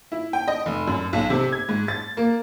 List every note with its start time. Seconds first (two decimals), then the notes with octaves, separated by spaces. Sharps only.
0.12 E4
0.33 G5
0.48 D#5
0.66 F1
0.87 F#2
1.13 B1
1.30 C3
1.52 G#6
1.69 G#2
1.88 A6
2.17 A#3